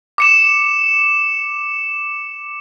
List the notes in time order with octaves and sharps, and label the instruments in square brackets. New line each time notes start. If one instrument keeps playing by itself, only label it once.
[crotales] D6 C#7 E7